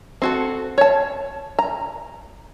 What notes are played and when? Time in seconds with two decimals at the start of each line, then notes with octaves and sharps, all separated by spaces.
0.22 C4 F#4 A4
0.78 C#5 A5
1.59 A#5